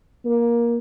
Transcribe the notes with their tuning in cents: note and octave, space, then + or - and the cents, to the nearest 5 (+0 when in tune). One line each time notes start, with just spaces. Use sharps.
A#3 +15